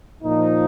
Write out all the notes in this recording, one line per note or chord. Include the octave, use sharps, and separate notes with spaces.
A#2 F3 D#4